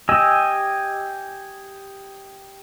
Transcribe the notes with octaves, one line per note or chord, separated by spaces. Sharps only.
G4 D#5 G#5 E6